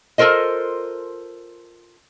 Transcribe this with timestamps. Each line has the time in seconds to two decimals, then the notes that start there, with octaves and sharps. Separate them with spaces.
0.18 F4 A4 A#4 C5 D#5